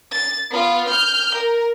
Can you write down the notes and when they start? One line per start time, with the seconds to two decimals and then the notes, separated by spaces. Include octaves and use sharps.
0.11 A6
0.51 B3 F4
0.88 F6 G6
1.34 A#4